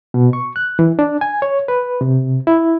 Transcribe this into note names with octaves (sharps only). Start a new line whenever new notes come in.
B2
C#6
F#6
E3
D4
G#5
C#5
B4
C3
E4